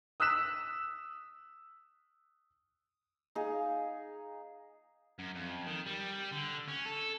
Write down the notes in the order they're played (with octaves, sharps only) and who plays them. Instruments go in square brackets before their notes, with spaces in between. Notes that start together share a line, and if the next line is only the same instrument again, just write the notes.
[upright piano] D#6 E6 F#6 B6 E7
[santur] D#4 G#4 F5
[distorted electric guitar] F#2
F2
D#3
G3
D3
C#4
A4